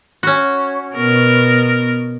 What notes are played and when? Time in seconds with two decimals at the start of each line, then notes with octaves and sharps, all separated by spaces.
0.23 C#4 F#4
0.95 B2 B3 A#4